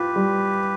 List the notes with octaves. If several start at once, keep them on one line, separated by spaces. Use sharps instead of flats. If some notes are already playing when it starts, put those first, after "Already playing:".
Already playing: F4 G4 B4
G3